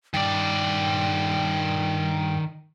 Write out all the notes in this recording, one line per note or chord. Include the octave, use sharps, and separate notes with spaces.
G2 D#3 D5 G5